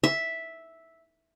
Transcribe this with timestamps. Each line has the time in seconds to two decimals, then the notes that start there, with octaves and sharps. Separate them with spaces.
0.04 E5